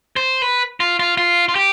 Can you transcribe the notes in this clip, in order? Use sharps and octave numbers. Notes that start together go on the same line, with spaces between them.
C5
B4
F4
F4
F4
F4
G4